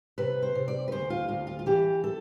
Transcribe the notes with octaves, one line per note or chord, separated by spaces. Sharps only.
C3 B4
C5
C3
D5
B4
D2 C5
F4
D2 F4
F4
F4
E3 G4
A4